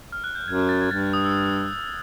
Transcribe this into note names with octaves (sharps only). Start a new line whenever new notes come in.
F6
F#6
G6
F#2 G#6
A6
G#6
G2 A6
A6
D#6
E6